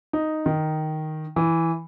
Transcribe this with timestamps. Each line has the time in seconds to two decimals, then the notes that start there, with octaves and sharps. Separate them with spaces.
0.13 D#4
0.46 D#3
1.36 E3